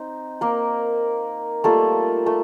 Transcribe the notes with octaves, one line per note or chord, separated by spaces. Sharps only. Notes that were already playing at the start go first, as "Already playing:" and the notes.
Already playing: C4 D#4
A#3 A#4
G3 A3 A#3 F4 A4
A3 A4